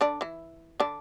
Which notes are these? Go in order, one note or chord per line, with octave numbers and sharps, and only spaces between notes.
D3 D4
E3 E4
D3 D4